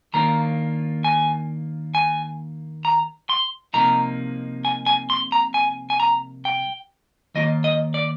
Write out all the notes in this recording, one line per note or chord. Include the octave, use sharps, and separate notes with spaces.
D#2 D#3 A#3 D4 F4 A#5
G#5
G#5
A#5
C6
C2 C3 F3 A#3 D#4 A#5
G#5
G#5
C6
A#5
G#5
G#5
A#5
G5
D#2 D#3 A#3 F4 D#5
D#5
D5